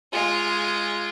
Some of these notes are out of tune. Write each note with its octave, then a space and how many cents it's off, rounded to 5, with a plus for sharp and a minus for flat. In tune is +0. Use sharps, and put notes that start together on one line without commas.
G#3 +0 F4 -10